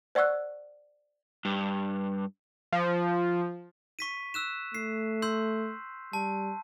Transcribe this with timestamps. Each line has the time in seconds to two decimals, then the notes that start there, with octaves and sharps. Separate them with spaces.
0.15 C5 D5 F#5 C#6 E6 F#6
1.45 G2
2.72 F3
3.99 C#6 B6 D#7
4.34 E6 F#6 E7
4.75 A3 C7
5.22 C6 E6 G6
6.13 G3 A5